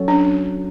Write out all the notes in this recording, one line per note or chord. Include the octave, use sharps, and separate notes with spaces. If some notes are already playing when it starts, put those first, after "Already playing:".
Already playing: F#3 C#4 F#4 A4
D4